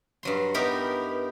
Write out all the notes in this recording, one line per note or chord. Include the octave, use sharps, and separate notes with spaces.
G2 F#3 C6
B3 D#4 E4 G4 A#4